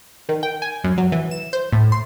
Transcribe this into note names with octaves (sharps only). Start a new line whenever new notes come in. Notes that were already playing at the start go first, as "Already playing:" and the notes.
D#3
G5
G#5
F#2
F#3
E3
E7
C5
A2
C6